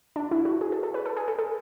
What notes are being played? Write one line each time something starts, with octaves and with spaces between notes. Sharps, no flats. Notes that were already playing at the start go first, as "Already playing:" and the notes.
D4
E4
F#4
G#4
A4
A4
B4
A4
G#4
A4
A4